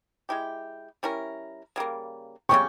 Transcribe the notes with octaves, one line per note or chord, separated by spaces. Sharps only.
G#3 E4 G4
G3 C#4 E4 A#4
C#3 G3 A#3
C#3 G3 C#4 G4 C#6